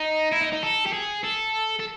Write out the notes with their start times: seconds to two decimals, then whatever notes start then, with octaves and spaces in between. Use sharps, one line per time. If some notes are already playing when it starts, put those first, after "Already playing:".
Already playing: D#4
0.32 E4
0.42 D#4
0.53 D#4
0.63 A4
0.86 G4
0.93 G#4
1.24 A4
1.79 A4